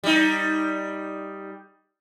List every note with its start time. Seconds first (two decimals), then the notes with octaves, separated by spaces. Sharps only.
0.04 G3 D#4